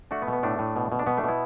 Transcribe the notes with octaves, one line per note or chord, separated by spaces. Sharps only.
A3 D4 F#4
B3
B2
B3
A2 A3 D4
A2
B2
B2
D4
B2 B3
A3 D4
B2 B3 E4